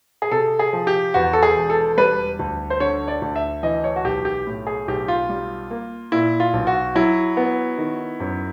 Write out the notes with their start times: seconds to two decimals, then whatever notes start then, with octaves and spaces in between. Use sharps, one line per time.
0.22 G#4
0.31 C3 A4
0.59 G#4
0.73 F3
0.87 G4
1.14 E2 F#4
1.33 A4
1.43 G#4
1.56 E1
1.70 A4
1.97 G3 B4
2.39 D2
2.70 C5
2.80 D3 C#5
3.08 D5
3.22 D2
3.36 E5
3.63 E3 D#5
3.84 C#5
3.96 F#4
4.04 B1 G4
4.25 G4
4.47 A2
4.67 G#4
4.88 B1 G4
5.08 F4
5.29 G3
5.71 A#3
6.12 A#2 E4
6.40 F4
6.53 B1
6.67 F#4
6.95 F#3 E4
7.37 B3
7.78 D#3
8.20 F#2